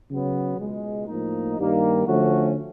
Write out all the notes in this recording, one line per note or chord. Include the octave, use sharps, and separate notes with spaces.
C#3 F#3 B3
C#2 B2 G#3
A2 F3 A#3 D#4
G2 D#3 G3 A#3 D#4
D3 F3 A3 C#4 F#4